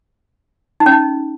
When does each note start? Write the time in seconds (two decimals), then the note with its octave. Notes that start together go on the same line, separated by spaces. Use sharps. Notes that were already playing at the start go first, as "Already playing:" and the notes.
0.80 D#4
0.86 C#4
0.92 D#4